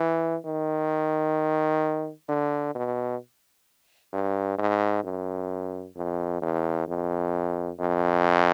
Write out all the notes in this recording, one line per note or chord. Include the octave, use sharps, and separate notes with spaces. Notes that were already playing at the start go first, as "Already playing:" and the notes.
Already playing: E3
D#3
D3
B2
G2
G#2
F#2
F2
E2
F2
F2